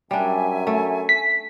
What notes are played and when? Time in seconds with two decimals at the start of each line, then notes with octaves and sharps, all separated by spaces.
0.11 F#2 G3 D4 E5 G#5
0.67 A3
1.09 B6